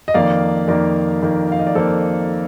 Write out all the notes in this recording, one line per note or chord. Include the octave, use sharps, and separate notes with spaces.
D#5
F2 D#3 A#3 D5 F5
F2 D#3 A#3 A#4 D5
F2 D#3 A#3
F5
D#5
D5
F2 D#3 A#3 A4 C5